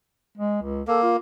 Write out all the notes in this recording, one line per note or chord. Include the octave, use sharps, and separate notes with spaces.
G#3
C#2
A#3 A4
F4